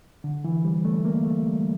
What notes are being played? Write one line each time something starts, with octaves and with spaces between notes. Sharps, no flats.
D3
E3
G3
A3
A#3
A3
G3